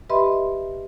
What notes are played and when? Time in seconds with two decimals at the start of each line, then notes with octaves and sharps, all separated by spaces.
0.10 G4 B4 D#5 E5 B5 C6